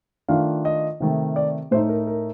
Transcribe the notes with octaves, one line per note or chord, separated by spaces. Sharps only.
D#3 A3 D4 F4 F5
D#5
C3 D#3 A3
D5
A2 A3 D#4 C5
A#4
A#4